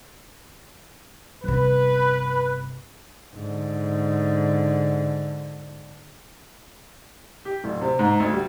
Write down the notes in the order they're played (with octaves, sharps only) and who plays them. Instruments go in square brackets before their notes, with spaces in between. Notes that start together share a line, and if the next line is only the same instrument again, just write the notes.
[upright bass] G1 C3 [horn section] B4
[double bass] G#2 D3
[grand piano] G4
D1
C3
G#2
D2
G3